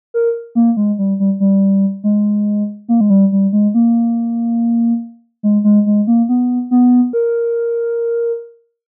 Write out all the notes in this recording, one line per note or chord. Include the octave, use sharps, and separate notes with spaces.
A#4
A#3
G#3
G3
G3
G3
G#3
A#3
G#3
G3
G3
G#3
A#3
G#3
G#3
G#3
A#3
B3
B3
A#4